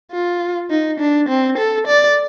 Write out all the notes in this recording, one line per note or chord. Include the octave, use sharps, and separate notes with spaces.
F4
D#4
D4
C4
A4
D5